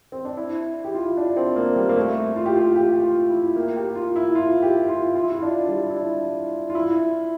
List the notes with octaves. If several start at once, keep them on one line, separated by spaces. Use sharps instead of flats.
C4
D4
E4
G4
F4
E4
D4
C4
A#3
G3
A#3
A3
F4
G4
F4
G4
F4
E4
A#3
G4
F4
E4
F4
G4
F4
F4
E4
F4
D4
G3
E4
D4
F4
E4